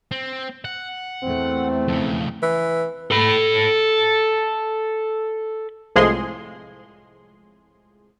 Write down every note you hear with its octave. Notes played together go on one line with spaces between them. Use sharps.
C4
F#5
E2 A3 C4
F2 C#3
E3
A4 B5
C2 A2 F3 G#3 G#4 C6